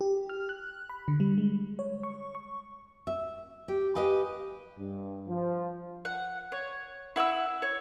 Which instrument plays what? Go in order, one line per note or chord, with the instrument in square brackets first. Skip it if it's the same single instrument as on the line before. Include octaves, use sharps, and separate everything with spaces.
[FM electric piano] G4
F6
F#6
B5
D3
G3
G#3
C#5
C#6
C#6
[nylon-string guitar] E5
G4
G4 B4 D#5 F5 G#5
[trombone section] G2
F3
[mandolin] F#5
C#5
E4 F#5 D#6 E6
C#5